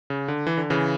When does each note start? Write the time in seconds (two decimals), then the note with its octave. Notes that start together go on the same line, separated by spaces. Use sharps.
0.10 C#3
0.28 D3
0.47 E3
0.57 D3
0.70 C#3 E3